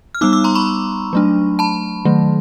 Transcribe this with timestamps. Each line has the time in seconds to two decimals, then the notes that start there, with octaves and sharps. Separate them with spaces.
0.15 F6
0.21 G3 B3 D#4 D6 E6
0.33 D6 E6
0.44 A#5 C6
0.55 B5 C#6
1.13 F#3 A3 D4
1.59 A5 B5
2.05 D#3 F#3 A3